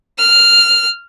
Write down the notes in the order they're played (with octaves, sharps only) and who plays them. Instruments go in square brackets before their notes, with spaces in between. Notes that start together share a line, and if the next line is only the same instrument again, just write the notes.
[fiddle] F6